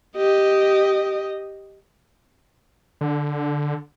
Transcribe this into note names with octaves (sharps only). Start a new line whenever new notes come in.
G4 D#5
D3